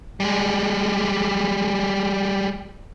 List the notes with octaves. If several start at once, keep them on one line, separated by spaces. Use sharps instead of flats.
G3 G#3